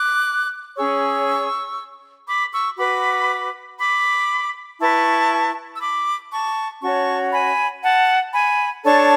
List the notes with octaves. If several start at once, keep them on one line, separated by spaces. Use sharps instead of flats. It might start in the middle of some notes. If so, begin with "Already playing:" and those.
Already playing: D6 F#6
C#4 G#4 C#5 C#6 E6
B5 D6
C#6 E6
F#4 B4 B5 D6
B5 D6
E4 B4 A5 C#6
E6
B5 D6
A5 C#6
C#4 F#4 C#5 A5 C#6
G#5 B5
F#5 A5
G#5 B5
D4 A4 C#5 A5 C#6